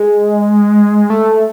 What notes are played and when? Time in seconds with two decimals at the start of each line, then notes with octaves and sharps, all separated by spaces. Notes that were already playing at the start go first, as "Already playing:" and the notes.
Already playing: G#3
1.10 A3